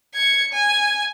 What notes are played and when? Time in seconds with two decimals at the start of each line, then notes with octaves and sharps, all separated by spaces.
0.14 G#6 C#7
0.53 G#5